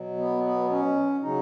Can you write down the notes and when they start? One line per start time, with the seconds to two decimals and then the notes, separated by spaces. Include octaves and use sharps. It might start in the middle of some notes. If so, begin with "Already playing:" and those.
Already playing: B2 F#3
0.18 B3
0.44 B3
0.70 C#4
1.22 C#3 F#3 D#4